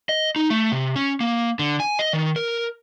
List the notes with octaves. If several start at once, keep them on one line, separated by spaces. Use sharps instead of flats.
D#5
D#4
A3
C3
C#4
A#3
D3
G#5
D#5
D#3
A#4